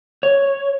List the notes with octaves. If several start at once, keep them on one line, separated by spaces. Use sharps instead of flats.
C#5